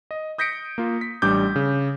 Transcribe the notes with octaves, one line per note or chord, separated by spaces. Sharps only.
D#5
D#6 G6 A#6 B6 C#7 D7
A#3 F4
B6
A1 G3 D4 D6 G6
C#3